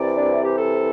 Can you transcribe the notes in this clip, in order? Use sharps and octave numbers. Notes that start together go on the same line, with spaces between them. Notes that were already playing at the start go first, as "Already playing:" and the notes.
Already playing: C2 C3 E3 D5
D4
E4
G4
A4